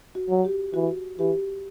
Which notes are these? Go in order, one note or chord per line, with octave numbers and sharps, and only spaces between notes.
F#4
F#3
G4
E3 F#4
E3 G4